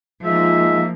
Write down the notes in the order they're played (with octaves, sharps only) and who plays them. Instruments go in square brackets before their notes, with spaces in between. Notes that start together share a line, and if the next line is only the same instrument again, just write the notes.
[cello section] F3 A#3 [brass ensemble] G#3 D#4 F4 [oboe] E5